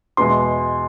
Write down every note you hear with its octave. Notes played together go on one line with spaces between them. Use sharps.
E2 B2 G#3 C6